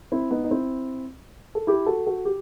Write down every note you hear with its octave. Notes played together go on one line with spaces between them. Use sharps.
C4 E4
B3 D#4
D#4
C4 E4
A4
E4 G4
F#4 A4
F#4 A4
G4